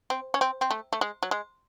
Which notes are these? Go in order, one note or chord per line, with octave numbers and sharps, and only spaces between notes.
C4
C#4
C4
C4
A3
A3
G#3
F#3
G#3